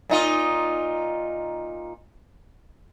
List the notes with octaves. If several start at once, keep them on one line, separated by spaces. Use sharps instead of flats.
A#2 D#4 F4